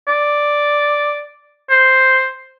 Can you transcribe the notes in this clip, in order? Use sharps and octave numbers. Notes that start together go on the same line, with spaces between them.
D5
C5